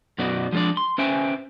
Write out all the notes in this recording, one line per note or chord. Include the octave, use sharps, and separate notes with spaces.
F#2 B2 B3 D#4 F#4 D5
F3 G#3 C4 D4 D5
C6
C#4 B4 C5 E5 G5 G#5